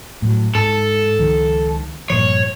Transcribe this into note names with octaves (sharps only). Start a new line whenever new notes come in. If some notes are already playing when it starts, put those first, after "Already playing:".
A2 F#3
G#2 A4
C#2 D#3 F3
G2 A#2 F3 C#5